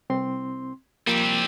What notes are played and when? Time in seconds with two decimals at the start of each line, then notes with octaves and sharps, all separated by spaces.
0.10 C2 C4 C6
1.07 F3 G3 A#3 C4